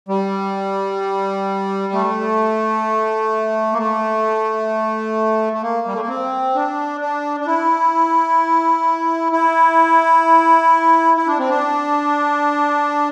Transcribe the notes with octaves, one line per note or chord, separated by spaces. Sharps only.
G3
A3
A#3
A3
A3
A#3
G3
A3
A#3
C4
D4
D4
D4
E4
E4
E4
D4
C4
D4